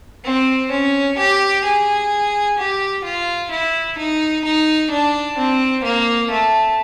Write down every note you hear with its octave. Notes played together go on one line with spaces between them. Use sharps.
C4
C#4
G4
G#4
G4
F4
E4
D#4
D#4
D4
C4
A#3
A3